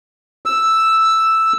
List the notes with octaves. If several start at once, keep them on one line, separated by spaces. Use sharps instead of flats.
E6